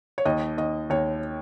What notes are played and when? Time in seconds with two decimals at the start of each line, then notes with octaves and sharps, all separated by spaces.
0.18 C#5
0.25 D#2 D#5
0.58 D#2 D#5
0.90 D#2 C#5